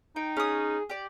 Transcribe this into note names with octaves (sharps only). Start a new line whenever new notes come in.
D#4 G5
C#4 G#4 D#6
G4 D5